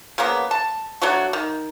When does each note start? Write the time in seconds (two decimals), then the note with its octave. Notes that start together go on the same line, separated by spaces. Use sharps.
0.18 C#3 F3 A#3 B3
0.51 A5
1.02 F#3 A3 D4 F#4
1.33 D#3